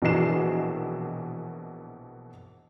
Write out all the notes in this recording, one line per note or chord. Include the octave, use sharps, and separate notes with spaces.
A#1 B2 D#3 E3 C7 E7